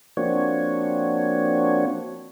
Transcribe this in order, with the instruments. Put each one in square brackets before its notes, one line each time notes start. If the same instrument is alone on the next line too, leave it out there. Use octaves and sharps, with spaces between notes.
[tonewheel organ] F3 A#3 C4 D4 F#4 C#5